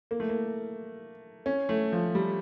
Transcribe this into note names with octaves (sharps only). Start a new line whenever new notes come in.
A#3
A3
A#3
C#4
A3
F3
G3